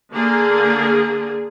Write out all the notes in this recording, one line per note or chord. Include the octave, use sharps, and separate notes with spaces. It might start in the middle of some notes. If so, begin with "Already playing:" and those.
D3 A#3 G#4